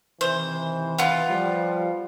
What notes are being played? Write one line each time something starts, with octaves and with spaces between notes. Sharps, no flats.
C3 D#3 E3 C5
B3 F4
F3 G3